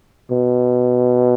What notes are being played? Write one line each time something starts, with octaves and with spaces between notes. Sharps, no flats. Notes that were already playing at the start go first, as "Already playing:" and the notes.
B2